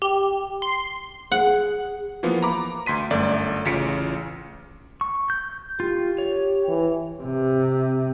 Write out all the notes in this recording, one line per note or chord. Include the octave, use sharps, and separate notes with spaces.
G4
C6
G#4 F#5
E3 F3 A#3 B3 F4
A#5 B5 D6
D2 C6 B6 D#7
G1 F#2 A3 D5
A1 C#3 F4 B6 C#7 D7
C#6
G6
F4 G4
C#5
E3
C3